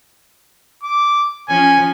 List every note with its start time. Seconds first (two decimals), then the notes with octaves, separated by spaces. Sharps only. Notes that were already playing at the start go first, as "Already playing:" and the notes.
0.83 D6
1.49 F3 C#4 G#5